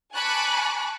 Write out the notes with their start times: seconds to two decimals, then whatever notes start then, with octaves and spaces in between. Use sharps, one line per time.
0.13 G#5 A5 B5 C#6 D6 F#6